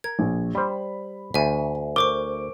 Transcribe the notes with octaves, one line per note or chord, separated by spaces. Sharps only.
A#4 G#6
A#1
G3 C5 B5
D2 E5 G#5
A#4 C5 C#6 D6